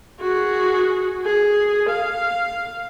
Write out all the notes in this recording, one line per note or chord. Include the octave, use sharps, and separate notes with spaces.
F#4 G#4
G#4
F5